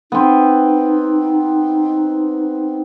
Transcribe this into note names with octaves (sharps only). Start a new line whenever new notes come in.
B3 C4 D#4